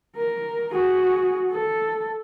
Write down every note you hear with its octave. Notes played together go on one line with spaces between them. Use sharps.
A#4
F#4 G#4
A4